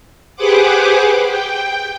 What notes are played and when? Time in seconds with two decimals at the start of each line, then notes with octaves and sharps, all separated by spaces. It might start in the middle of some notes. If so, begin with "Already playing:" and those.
0.36 G4 G#4 B4 C5 F#5 D6
1.26 G5